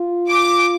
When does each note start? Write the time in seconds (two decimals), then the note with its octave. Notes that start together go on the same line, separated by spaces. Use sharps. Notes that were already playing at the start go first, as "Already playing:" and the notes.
Already playing: F4
0.28 D6